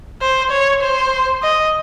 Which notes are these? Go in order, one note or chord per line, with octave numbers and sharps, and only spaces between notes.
C5
C#5
C5
D#5